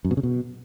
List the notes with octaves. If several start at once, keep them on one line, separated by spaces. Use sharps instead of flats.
F#2
B2
C#3
B2